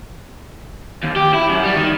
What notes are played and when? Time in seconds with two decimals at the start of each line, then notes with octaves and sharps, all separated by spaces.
1.03 D#2
1.16 G4
1.34 E4
1.49 F#2
1.64 G3
1.76 D#3